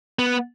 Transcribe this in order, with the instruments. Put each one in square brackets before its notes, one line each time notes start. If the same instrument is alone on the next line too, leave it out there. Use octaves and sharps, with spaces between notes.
[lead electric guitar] B3